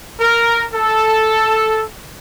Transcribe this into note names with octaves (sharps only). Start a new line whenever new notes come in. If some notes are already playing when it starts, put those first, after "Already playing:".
A#4
A4